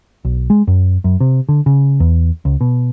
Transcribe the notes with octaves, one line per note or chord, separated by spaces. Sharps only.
B1
G#3
F#2
F#2
C3
D3
C#3
E2
C#2
B2